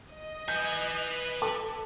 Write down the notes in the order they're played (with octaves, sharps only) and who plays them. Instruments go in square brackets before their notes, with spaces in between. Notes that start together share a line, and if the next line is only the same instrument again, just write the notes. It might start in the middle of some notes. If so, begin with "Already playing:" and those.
[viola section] D#5
[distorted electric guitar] B4 G#5 [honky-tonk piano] G6 C#7
[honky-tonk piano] A4 D6